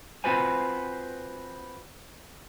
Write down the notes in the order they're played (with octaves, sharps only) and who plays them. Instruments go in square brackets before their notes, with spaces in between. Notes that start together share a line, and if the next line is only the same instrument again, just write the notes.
[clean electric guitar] C4 F4 F#4 B4 C5 G#5